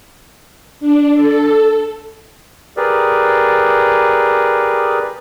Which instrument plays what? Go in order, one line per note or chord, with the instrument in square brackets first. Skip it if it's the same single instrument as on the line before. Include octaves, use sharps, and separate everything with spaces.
[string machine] D4
A4
[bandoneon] G4 G#4 A#4 B4 D5